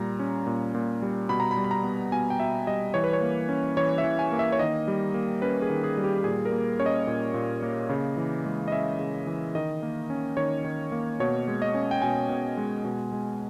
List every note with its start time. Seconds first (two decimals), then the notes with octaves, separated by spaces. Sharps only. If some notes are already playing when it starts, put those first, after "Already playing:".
Already playing: A#2 G3 A#5
0.20 C#4
0.47 A#2
0.75 A#2
1.02 G3
1.29 B2 B5
1.40 A#5
1.51 B5
1.57 G3
1.64 B5
1.71 A#5
1.84 B3
2.12 B2 G#5
2.30 G5
2.40 B2 E5
2.67 G3 D#5
2.94 E3 C#5
3.04 B4
3.13 C#5
3.21 A#3
3.49 C#4
3.77 E3 C#5
3.98 E5
4.04 E3
4.19 G#5
4.32 A#3
4.39 E5
4.52 C#5
4.59 D#3 D#5
4.88 G3
5.14 A#3
5.42 C#4 B4
5.62 G#4
5.70 D#3
5.84 G#4
5.97 G3
6.04 G4
6.24 A#2 G#4
6.45 A#4
6.52 A#3
6.79 C#4 C#5
6.86 D#5
7.07 A#2
7.34 A#2
7.63 A#3
7.90 C#3
8.17 E3
8.45 G#3
8.68 D#5
8.72 C#4 E5
8.99 C#3
9.27 E3
9.55 D#3 D#5
9.83 A#3
10.10 C#4
10.37 D#3 C#5
10.64 D#3
10.92 A#3
11.20 B2 C#5
11.48 G#3
11.62 D#5
11.74 C#4
11.91 G5
12.02 B2 G#5
12.29 B2
12.57 G#3
12.85 B2
13.13 G#3